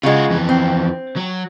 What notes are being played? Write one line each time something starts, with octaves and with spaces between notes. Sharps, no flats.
C#3 G#3 F4 F#4
F2 E3
C4
F#3